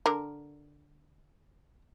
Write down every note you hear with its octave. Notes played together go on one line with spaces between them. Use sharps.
D3 A#4